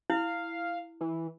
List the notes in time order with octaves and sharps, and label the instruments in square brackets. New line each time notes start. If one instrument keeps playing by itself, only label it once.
[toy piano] E4 [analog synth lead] F5
[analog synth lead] E3